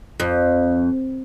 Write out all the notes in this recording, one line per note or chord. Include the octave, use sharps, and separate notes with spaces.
F2